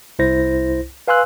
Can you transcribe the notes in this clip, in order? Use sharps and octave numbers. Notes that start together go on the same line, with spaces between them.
C2 E4 C5 A#6
B4 F5 G#5 C6 E6 F#6